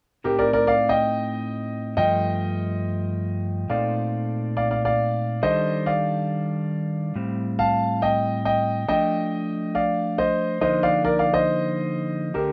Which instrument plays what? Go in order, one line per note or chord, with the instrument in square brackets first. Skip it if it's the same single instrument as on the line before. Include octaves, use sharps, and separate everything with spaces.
[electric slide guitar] A2 A3 C4 D#4 [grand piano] G4 A#4
[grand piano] A#4 D5
A#4 D5
D5 F5
D#5 G5
[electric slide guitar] G2 F3 A3 [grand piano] D#5 G5
[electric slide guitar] A#2 A3 C4 D#4 A4 [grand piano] D5 F5
[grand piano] D5 F5
D5 F5
D5 F5
[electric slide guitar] D#3 G3 D4 A4 [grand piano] C5 D#5
[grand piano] D5 F5
[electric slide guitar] A2 G3 C4
[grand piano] F5 A5
D#5 G5
D#5 G5
[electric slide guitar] F3 A3 D4 [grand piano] D#5 G5
[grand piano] D5 F5
C5 D#5
[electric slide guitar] D3 F3 A#3 D#4 [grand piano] C5 D#5
[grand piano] D5 F5
A#4 D5
D5 F5
C5 D#5
[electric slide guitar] D3 A3 D4 A4 [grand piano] G4 A#4